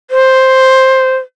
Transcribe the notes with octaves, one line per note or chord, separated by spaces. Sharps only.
C5